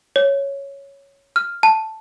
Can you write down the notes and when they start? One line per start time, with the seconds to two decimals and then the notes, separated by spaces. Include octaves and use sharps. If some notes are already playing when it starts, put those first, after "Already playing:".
0.16 C#5
1.36 F6
1.63 A5